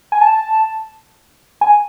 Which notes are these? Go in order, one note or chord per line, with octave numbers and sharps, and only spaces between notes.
G#5
A5
G#5